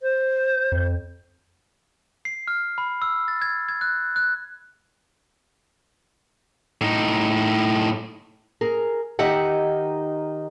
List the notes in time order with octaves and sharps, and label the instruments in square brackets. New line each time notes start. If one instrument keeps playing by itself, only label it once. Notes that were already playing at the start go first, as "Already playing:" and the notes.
[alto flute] C5
[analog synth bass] F2
[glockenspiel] C7
F6
B5
E6
A6
G#6
G#6
F#6
F#6
[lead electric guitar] A2 D#4
[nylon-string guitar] G#4 A#4
D#3 D#4 G4 E5 F#5